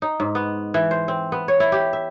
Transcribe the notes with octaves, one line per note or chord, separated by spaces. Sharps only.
D#4
G#2
B3
E3
C5
C4
B3
C#5
E4
G4
E5